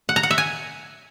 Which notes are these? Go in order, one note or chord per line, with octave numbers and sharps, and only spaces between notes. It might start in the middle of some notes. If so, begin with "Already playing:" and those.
F#5
A#5
F#5
E5
G#5